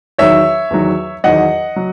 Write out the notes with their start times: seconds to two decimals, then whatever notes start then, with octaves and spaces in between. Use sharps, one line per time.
0.18 E2 D#3 F#3 C#5 E5
0.71 E2 D#3 F#3
1.24 E2 D#3 F#3 D#5 F#5
1.76 F#3